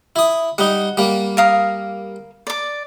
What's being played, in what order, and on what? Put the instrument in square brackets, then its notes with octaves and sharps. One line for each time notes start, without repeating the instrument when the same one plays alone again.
[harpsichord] E4 D#6
[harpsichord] G3 D#4 [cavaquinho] F#5
[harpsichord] G3 A#3
[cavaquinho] A#4 F5 D#6
D5 D6